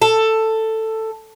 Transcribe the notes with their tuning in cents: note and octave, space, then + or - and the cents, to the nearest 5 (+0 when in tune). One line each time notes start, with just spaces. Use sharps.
A4 +10